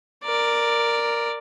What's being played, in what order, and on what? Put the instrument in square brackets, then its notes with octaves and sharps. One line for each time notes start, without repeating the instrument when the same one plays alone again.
[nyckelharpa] A#4 D5